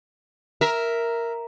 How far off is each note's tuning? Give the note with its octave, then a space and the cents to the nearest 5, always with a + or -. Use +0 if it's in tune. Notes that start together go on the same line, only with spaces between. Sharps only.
A#4 +0 E5 +0